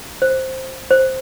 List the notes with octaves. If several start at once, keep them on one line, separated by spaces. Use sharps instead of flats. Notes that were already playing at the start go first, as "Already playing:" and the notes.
C5
C5